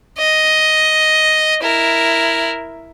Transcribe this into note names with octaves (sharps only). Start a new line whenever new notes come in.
D#5
E4 A#4